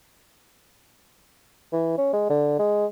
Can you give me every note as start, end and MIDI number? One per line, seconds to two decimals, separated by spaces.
1.73 1.93 52
1.98 2.12 61
2.13 2.28 56
2.30 2.55 50
2.59 2.86 56